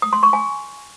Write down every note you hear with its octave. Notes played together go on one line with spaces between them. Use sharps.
D#6
C6
C#6
G#5